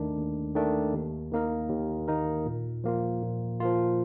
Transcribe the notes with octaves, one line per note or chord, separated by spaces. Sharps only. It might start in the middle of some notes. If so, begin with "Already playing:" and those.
Already playing: D#2 D#3 A3 D4
D#2
D#3 A3 D4
D#2
D#3 A#3 D#4 A#4
D#2
D#3 A#3 D#4 A#4
A#2
F3 A#3 F4
A#2
F3 A#3 F4